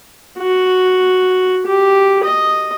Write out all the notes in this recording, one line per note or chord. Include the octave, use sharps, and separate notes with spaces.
F#4
G4
D#5